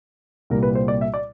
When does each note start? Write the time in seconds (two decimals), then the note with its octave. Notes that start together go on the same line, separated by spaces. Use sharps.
0.50 C2 A#2 G3 A#3 A#4
0.63 B4
0.75 C5
0.88 D5
1.01 E5
1.14 D5